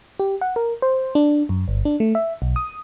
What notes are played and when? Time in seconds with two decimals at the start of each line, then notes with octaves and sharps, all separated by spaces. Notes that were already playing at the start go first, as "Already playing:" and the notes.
0.19 G4
0.41 F#5
0.56 A#4
0.82 C5
1.15 D4
1.49 F#2
1.68 G1
1.85 D4
2.00 A3
2.15 E5
2.42 B1
2.56 D#6